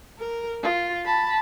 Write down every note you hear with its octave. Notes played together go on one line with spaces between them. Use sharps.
A#4
F4
A5 B5